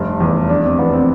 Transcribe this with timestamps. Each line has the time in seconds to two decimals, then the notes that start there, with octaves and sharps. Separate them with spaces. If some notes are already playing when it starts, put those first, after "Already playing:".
Already playing: F1 G2
0.20 E2
0.49 F1 D4
0.64 C4
0.79 E2 B3
0.93 C4